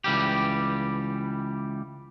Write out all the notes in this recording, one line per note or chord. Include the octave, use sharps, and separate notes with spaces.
C#2 E3 G3 G4